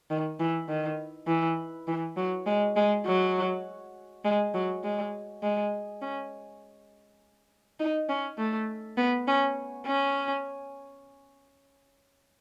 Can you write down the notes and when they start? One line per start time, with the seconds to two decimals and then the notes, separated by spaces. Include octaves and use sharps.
0.10 D#3
0.40 E3
0.69 D#3
1.28 E3
1.88 E3
2.17 F#3
2.46 G#3
2.76 G#3
3.06 F#3
4.25 G#3
4.54 F#3
4.84 G#3
5.43 G#3
6.02 C#4
7.80 D#4
8.09 C#4
8.38 A3
8.97 B3
9.27 C#4
9.86 C#4